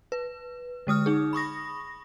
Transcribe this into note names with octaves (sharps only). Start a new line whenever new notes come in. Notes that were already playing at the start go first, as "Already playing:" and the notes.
B4
D3 G#3 D#6 F6
D#4 G#4
B5 C#6 D#6 A#6